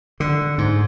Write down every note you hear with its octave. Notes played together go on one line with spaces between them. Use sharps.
D3
G#2